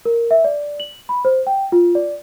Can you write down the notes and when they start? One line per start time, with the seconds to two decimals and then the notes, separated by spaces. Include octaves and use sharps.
0.05 A#4
0.31 E5
0.44 D5
0.80 F#7
1.09 B5
1.25 C5
1.47 G5
1.72 F4
1.95 D5